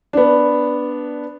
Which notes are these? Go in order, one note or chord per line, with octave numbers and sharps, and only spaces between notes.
B3 D4